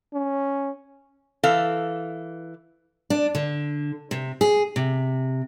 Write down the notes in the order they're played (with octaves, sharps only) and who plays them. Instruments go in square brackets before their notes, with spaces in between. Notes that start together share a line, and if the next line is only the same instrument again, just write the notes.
[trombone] C#4
[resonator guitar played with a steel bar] E3 A4 F5
[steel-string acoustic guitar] D4
D3
C3
G#4
C3